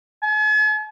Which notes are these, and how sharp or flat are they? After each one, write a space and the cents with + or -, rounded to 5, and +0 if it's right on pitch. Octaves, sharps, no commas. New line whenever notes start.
G#5 +45